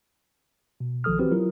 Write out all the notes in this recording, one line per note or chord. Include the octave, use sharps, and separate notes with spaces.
B2
B1 D#3 F3 A4 D#6 F6
E3 C4 F#4 G4 B4 C5
F#3 E4 F4 A#4